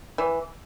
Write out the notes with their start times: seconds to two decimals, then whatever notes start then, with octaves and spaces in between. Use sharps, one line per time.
0.18 E3